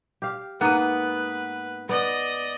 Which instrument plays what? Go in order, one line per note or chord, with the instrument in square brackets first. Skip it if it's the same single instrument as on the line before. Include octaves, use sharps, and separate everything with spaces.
[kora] G4 F5
[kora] G#2 A#3 [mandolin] B3 D#6 [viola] B4
[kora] B3 [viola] D5 D#5